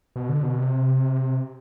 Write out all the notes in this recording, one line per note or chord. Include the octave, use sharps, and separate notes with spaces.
B2
D3
B2
C3